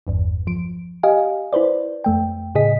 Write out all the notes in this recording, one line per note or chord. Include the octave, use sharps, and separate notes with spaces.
G1 E2 G2
F3 D7
G4 D#5 F5 G#5
E4 B4 C5 D5
F2 A3 G5
A2 C#3 G#4 D#5 B6